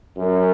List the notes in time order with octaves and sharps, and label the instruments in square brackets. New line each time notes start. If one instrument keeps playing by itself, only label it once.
[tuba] F#2